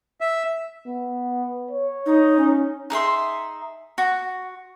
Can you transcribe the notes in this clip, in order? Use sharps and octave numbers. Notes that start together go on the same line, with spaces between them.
E5
B3
C#5
D#4
C#4
D#4 G#4 E5 C6
F#4